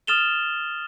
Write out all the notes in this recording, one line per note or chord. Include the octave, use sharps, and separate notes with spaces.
D#6 F6 A6 E7 F7 G7